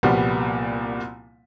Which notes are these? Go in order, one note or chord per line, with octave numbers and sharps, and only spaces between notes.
C2 A#2 F3 G3 B3 F#4